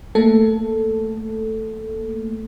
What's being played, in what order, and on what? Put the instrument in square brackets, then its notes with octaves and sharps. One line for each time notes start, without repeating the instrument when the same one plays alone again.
[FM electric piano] A3 A#3 A4